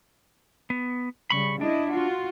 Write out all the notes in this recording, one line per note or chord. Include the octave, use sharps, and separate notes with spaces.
B3
C#3 G3 B5 C#6
D4 E4 D#5
F4 F#4